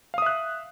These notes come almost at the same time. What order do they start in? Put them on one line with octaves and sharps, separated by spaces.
F5 D#6 E5 F#6